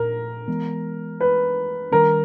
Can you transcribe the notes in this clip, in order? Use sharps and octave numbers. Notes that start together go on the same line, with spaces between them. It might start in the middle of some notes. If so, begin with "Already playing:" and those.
Already playing: A#2 A#4
E3 G#3 B3
B4
D#3 G3 C#4 A#4